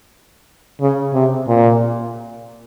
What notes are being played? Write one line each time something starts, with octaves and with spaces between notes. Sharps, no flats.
C#3
C3
A#2